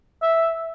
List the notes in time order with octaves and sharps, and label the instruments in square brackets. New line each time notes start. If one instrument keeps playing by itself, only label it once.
[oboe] E5